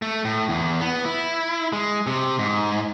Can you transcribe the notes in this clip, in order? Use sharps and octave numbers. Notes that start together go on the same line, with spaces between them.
A3
A2
E2
B3
E4
G#3
C3
G#2